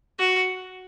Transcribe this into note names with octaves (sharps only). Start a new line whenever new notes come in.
F#4